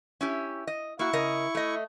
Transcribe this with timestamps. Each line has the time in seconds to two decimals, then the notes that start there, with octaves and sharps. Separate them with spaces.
0.21 C#4 E4 G4
0.67 D#5
0.99 A#3 E4 F#4 C#6
1.13 C#3 A#4 D#5
1.55 A3 D#5